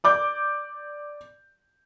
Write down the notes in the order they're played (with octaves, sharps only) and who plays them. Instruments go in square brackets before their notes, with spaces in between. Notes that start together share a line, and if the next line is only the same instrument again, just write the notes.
[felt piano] D5 D6 G6